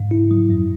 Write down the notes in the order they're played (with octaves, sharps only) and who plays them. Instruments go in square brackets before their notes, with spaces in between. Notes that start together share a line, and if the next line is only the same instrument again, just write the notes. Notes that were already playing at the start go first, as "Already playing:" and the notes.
Already playing: [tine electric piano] G#2
E4
F#3
F#2